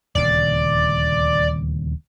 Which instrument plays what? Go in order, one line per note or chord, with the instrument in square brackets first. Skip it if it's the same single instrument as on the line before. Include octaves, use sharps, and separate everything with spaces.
[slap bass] D#1 D2 C#3 [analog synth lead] D5